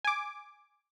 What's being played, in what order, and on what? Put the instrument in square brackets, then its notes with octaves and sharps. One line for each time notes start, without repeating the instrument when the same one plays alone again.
[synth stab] G#5 D6